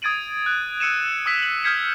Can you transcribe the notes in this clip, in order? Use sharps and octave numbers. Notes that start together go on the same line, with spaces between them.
D#6 G#6 A6 D7 D#7 F#7
F#6
E6 C#7 D#7 E7
D#6 E6 B6
F#7
D#6 F6 G6 G#6 B6 C#7